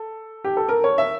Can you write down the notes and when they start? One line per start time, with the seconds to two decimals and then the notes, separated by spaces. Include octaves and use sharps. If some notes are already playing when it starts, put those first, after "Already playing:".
Already playing: A4
0.44 G4
0.57 A4
0.69 A#4
0.84 C#5
0.98 E5